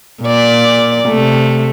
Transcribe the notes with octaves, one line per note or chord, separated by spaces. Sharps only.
A#2 D5
C3 A3